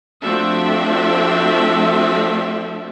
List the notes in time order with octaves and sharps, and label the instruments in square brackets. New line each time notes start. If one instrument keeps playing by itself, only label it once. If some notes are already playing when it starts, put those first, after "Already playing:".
[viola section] F3 A3 C4 D4 F#4 E5